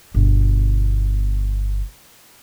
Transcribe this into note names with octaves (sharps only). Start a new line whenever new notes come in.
G1 B2